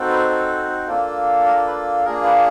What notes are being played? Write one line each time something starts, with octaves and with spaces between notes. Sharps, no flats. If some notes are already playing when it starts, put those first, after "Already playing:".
Already playing: C4 D#4 F#4 A4
B4
A4
A#3 D4 F4 A4
A#4
B4
A#3 D4 F4 G#4 A#4
B4